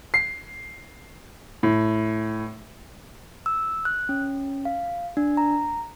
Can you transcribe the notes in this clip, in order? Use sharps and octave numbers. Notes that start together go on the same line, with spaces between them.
C7
A2
E6
F#6
C#4
F5
D4
A#5